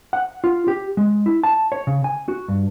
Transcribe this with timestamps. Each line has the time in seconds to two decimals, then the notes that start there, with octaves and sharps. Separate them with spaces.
0.13 F#5
0.44 F4
0.68 G4
0.97 G#3
1.26 E4
1.43 A5
1.72 C#5
1.87 C#3
2.04 G#5
2.28 F#4
2.48 G2